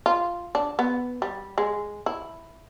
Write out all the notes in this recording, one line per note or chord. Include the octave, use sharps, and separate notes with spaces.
F4
D4
B3
G3
G#3
E4